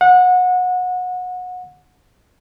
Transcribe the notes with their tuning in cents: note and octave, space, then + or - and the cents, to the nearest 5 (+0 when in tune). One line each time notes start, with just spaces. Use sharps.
F#5 -25